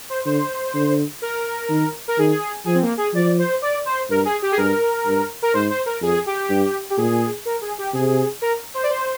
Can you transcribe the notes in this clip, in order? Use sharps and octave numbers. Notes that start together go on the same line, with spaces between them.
C5
D3 C5
D3
A#4
D#3
A#4
D#3 G#4
F3 G#4
C4
A#3
G#4
F3 D5
C5
D5
C5
G2 A#4
G#4
G4
G#4
G2 A#4
G2
A#4
G#2 C5
C5
A#4
F2 G#4
G4
G2
G4
A#2 G#4
A#4
G#4
G4
C3 G#4
A#4
C5
D5
C5